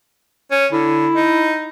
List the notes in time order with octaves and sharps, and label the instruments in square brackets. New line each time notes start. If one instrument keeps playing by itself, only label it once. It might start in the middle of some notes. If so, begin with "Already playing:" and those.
[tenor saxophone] C#4
[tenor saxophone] D3 [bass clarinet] E4
[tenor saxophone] D#4